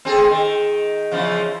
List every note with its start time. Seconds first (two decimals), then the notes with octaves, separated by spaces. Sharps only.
0.05 C4 G#4 A4
0.30 D#3
1.11 E2 C#3 F3